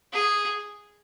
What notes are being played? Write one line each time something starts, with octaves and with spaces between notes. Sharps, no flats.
G#4